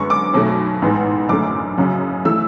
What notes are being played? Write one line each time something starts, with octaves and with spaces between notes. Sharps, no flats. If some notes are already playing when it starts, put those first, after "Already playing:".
Already playing: F#2 D3 G#3 B3 C#6
D6
B1 B2 F#3 A3
A1 G#2 G#3 B3
F#1 F#2 D3 A3 D6
F#1 F#2 C#3 F#3
E3 A3 E6